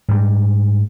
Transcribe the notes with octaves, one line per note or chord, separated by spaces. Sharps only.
G#2 G3